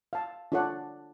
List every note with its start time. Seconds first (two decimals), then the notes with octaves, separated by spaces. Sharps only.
0.13 F5 A5
0.52 D4 F4 A4 C#5 D5 F#5